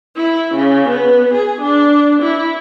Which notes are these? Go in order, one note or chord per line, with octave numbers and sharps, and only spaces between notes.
E4
C#3
B3
G#4
D4
E4